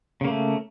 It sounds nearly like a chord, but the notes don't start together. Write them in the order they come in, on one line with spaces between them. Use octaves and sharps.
C#3 A#3 A3